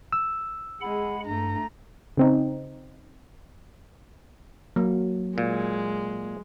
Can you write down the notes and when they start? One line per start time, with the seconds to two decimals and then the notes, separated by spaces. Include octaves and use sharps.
0.13 E6
0.81 G#3 G#4 F#5 B5
1.26 G2 A3 A#5
2.17 C#3 C4 D#4
4.76 F#3 A#3
5.38 A#2 G#3